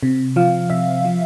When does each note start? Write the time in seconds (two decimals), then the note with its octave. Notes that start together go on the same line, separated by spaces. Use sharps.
0.03 C3
0.36 F3 F5
0.70 C3 E5
1.05 F3